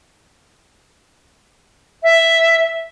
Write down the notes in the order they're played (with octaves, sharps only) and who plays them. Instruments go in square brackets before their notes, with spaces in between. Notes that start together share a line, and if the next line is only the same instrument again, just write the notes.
[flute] E5